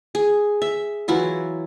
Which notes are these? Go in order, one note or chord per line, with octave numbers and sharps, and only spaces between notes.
G#4
E5
E3 F#3 E4 F4